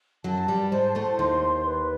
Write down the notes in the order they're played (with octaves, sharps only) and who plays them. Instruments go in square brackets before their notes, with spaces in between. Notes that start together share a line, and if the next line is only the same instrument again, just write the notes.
[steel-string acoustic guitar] F#2 F#3 [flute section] A5
[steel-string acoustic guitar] G2 G3
[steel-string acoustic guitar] G#2 G#3 [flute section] C5
[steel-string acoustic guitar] A2 A3
[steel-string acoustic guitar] D#2 D#3 [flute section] C6
[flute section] B4